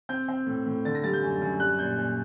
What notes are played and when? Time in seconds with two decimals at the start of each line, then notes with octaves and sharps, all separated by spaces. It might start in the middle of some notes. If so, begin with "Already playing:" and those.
0.09 C4 G6
0.29 C4
0.47 A2
0.66 A2
0.85 D3 A6
0.95 A#6
1.04 G3 A6
1.13 G6
1.23 F#2
1.42 F#2
1.60 G3 F#6
1.79 A#2 G6
1.98 A#2